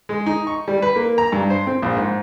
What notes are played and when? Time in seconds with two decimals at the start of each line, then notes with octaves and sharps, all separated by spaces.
0.09 G#3
0.26 D#4
0.47 C#6
0.68 G3
0.82 B4
0.96 A#3
1.18 A#5
1.32 G2
1.50 C5
1.67 C4
1.82 A#1
1.96 G#2